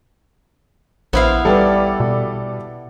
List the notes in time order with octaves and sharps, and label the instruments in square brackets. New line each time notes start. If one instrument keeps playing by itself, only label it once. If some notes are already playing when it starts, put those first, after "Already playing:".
[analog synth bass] A#1 [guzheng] B3 E4 F5 [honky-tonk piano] C5
[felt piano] G3 B4 [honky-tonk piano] A4 D5
[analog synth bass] B2